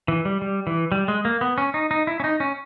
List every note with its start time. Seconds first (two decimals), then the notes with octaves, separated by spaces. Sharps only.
0.08 E3
0.25 G3
0.42 G3
0.67 E3
0.92 G3
1.08 G#3
1.25 A#3
1.41 B3
1.58 C#4
1.74 D#4
1.91 D#4
2.07 E4
2.20 C#4
2.24 D#4
2.40 C#4